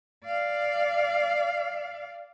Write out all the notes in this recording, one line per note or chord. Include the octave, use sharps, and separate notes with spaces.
D5 F5